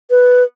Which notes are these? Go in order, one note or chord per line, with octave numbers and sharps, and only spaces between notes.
B4